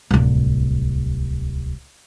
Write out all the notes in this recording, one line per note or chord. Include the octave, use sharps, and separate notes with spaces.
D1 C2